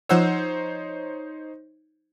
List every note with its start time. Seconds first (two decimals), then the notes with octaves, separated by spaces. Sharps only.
0.09 F3 D#4 C5 C#5 F#5 E6